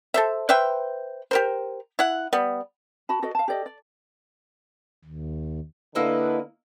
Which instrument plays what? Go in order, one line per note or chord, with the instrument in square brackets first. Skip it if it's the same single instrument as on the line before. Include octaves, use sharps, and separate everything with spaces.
[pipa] A4 C5 E5
B4 C5 E5 G5
G4 A#4 C5
E4 F#5
G3 B3
[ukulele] F#4 A5 B5
F#4 A4 D5 D#5
F5 A5
G4 A4 D5 D#5
D5
[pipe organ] D#2
[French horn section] D3 B4 [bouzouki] A#3 E4 D#5